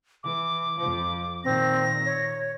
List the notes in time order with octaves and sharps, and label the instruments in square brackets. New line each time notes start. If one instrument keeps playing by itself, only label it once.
[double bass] E3 [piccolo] D6
[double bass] F2 F3
[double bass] A#2 D#3 [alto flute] C4 [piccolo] A#6
[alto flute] C#5